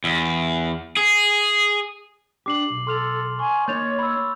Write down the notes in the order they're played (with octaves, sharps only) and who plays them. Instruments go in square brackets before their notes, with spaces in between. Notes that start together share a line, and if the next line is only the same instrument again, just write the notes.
[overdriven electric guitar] E2
G#4
[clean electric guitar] D4 G4 [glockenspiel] D6 C7 F#7
[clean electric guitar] B1
[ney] A4 [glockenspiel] C6 F6 F7
[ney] G#5 [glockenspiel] C#6
[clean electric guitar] A#3 D#4 [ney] C#5 [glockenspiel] G6 A6 F7
[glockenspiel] B5 E6